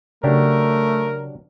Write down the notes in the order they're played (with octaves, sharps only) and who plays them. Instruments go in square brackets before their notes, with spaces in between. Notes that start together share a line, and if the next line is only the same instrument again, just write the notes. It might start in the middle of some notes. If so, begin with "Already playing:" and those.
[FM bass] C#3 [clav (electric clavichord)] F#3 D4 G4 [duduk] A3 [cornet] A#4